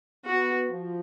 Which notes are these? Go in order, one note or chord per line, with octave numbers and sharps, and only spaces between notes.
B3 F#4
F3